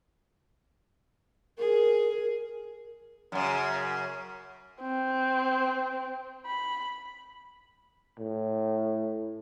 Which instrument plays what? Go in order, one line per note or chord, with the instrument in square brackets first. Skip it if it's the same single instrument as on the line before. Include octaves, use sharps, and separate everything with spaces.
[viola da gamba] G#4 [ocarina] A#4
[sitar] F#2 C#3
[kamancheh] C4
B5
[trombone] A2